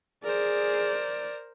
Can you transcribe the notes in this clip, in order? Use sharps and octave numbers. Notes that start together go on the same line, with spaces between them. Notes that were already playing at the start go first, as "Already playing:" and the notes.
G#4 A#4 C5 D5